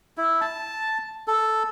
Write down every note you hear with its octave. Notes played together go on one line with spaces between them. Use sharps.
E4
A5
A4